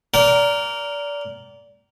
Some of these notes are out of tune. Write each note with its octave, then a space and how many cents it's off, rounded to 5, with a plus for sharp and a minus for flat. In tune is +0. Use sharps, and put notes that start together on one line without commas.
A#4 +0 D5 -25 G5 -35